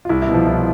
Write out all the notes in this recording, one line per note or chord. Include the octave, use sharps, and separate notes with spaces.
F4
C2 E4
E4
B2
F3 F4
C2